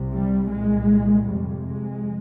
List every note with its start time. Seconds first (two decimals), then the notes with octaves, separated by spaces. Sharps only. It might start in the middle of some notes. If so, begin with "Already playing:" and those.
Already playing: C2 C3
0.12 G3
0.51 C2 A#2 G#3
1.28 F2 C3 G3
1.66 G#3